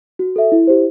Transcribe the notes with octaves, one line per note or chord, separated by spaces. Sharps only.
F#4
A4 E5
E4
G4 C5